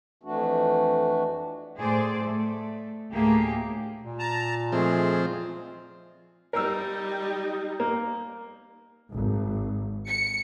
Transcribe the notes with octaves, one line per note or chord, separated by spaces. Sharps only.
F2 E3 A3 D4 F#4
A2 G#4 C5 D5
A3
D2 A2 A#3 G4 G#4
A#2
A5 A#5
F3 G#3 A3 C4 G#4
G3 D#4 A#4 E6
A#3
G#1
C#7